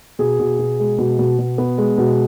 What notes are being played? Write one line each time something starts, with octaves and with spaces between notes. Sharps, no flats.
B2 G#4
B2
B2
G#3
B2
B2
B2
B3
G#3
B2